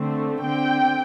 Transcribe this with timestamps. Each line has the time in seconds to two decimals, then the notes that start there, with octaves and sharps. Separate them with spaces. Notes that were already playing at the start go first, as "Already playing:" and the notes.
Already playing: D3 A3 C4
0.42 D3 C4 G5